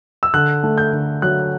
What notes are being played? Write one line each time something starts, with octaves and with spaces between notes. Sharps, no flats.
E6
D3 F#6
A3
G6
D3
F#3 F#6